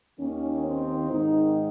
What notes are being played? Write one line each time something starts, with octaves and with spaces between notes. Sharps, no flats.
D#2 D#3 A#3 C#4
C4 D#4
G#2 D#3 C4 D#4